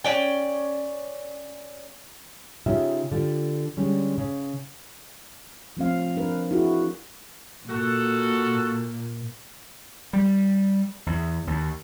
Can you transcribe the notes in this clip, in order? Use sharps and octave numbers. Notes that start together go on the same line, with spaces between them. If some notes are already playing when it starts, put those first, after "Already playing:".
C#4 D5 G5
C#3 D#4 F4 G4 E5
D3 F4 G4
D3 G3 G#3 C#4
C#3
F3 A3 C4 F5
D4 A#4 B4
E4 F#4 G#4
A#2 F#4 A4
G3
E2
D#2